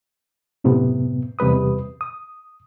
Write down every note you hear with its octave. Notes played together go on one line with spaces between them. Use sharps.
F#2 A2 C3 B3
E2 C3 G3 B4 D#6
D#6